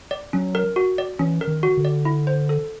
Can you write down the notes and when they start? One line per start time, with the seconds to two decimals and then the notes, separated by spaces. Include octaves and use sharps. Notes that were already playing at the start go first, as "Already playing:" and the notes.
0.11 D5
0.33 F#3 C#4
0.55 A#4
0.76 F#4
0.98 D5
1.19 E3 C#4
1.41 A#4
1.47 D#3
1.63 F#4
1.77 D3
1.85 D5
2.05 E4
2.27 C5
2.49 A4